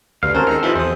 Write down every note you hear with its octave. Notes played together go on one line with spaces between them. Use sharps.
D2 G2 F5
G#1 C4 C#4 F#4 A#4 C5 A5
D#3 G#4 A4 A#5 F6
F2 C3 E3 F3 D#4 B4 B5
E2 C5 D#6